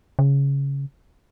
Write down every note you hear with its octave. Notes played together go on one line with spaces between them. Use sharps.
C#3